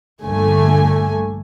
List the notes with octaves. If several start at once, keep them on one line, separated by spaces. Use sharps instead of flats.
A#1 G2 D3 A3 G#5